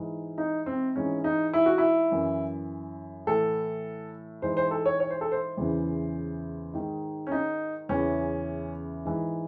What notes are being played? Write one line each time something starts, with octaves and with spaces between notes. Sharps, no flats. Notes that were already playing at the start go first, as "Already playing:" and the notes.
Already playing: G#2 E3
D#4
C4
G#2 E3 C#4
D#4
E4
F#4
E4
F#2 E3
A2 E3 A4
G#2 E3 C5
C5
A4
C#5
C#5
C5
A4
C5
E2 C#3 E3
G#2 D#3
C#4
D#4
E2 C#3 E3 C#4
G#2 E3